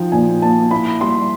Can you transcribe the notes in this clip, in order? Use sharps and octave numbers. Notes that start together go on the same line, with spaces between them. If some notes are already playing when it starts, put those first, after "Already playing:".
Already playing: F3 D#4 G5
A#2 G#5
A#3 A5
E4 B5
G3 C6